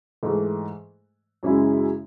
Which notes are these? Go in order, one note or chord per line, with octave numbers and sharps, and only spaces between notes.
G#2 E3 A3
F#2 C#3 G#3 C#4 E4